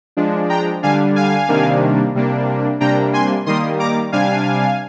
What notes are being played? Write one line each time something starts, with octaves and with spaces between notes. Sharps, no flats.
F3 G#3 D4
G5 A#5
D3 G3 D4 F5 G#5
F5 G#5
C3 D#3 G3 A#3 D4
C3 G3 A#3 D4
C3 G3 A#3 D4 G5 A#5
G#5 C6
D#3 G3 A#3 C6 D#6
A#5 D6
C3 G3 D4 F5 G#5